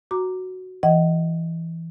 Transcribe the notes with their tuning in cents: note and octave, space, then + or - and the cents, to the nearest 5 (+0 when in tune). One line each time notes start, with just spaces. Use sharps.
F#4 +0 A#5 +0 D6 +0
E3 +5 D#5 +0 F#5 +40